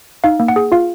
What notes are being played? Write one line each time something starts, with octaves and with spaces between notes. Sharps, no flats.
D#4 F5
A#3
F#5
G#4
F4 F5